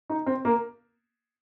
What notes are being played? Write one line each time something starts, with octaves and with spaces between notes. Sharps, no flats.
D#4
C4
A#3